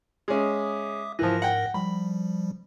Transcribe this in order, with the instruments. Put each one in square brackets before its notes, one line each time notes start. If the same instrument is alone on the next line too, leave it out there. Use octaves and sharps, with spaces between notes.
[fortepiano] G#3 C#4 [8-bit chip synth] E5 D6 D#6
[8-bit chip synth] G#2 A#4 A#6 [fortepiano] E3 F3
[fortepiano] F#5 G5
[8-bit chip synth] F3 G3 [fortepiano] B5